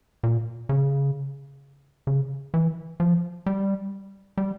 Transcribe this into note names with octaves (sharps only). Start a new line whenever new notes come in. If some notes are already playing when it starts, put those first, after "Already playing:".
A#2
C#3
C#3
E3
F3
G3
G3